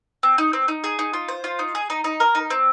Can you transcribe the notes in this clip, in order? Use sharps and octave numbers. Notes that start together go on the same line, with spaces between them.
C4
D#4
C4
D#4
G#4
D#4
F4
C5
F4
D#4
G#4
D#4
D#4
A#4
D#4
C4